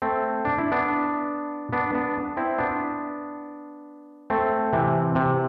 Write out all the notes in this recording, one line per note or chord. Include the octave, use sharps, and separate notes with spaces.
A3 C4
D4
E4
B3 D4
B3 D4
B3 D4
C4 E4
B3 D4
A3 C4
C3 E3
C3